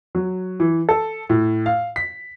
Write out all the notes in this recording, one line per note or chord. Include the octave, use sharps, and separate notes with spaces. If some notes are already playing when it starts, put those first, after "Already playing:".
F#3
E3
A4
A2
F5
B6